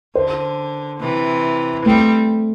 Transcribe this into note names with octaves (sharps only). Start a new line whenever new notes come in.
D3 C5
C3 E3
G3 A3 C4